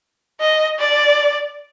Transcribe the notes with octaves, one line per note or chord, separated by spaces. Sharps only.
D#5
D5